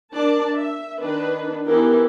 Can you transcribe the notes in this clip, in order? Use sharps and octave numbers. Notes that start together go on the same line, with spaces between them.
D4 A#4 D5 A5
E5
D#3 D4 B4
E3 B3 E4 G4 A#4